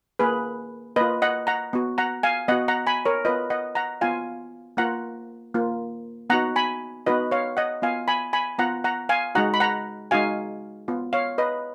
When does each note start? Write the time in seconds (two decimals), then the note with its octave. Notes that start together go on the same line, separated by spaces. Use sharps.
0.19 A#3 F4 G#4 B4
0.96 A#3 F4 B4 D#5
1.22 D#5 F#5
1.47 F#5 A#5
1.73 B3 F#4
1.98 F#5 A#5
2.23 F5 G#5
2.48 B3 D#5 F#5
2.51 F#4
2.68 F#5 A#5
2.87 G#5 B5
3.05 A#4 C#5
3.25 B3 F4 B4 D#5
3.50 D#5 F#5
3.75 F#5 A#5
4.01 B3 F4 F5 G#5
4.77 A#3 F4 F#5 A#5
5.55 A#3 F4
6.30 B3 D#4 F#4 F#5 A#5
6.56 G#5 B5
7.06 B3 D#4 F#4 B4 D#5
7.31 C#5 F5
7.57 D#5 F#5
7.82 B3 F4 F5 G#5
8.08 G#5 B5
8.33 G#5 B5
8.58 B3 F4 F#5 A#5
8.84 F#5 A#5
9.09 F5 G#5
9.35 G#3 D#4 F#4 F#5 A#5
9.54 B5
9.60 F#5 A#5
10.11 G#3 D#4 F#4 F5 G#5
10.88 B3 F4
11.13 C#5 F5
11.38 B4 D#5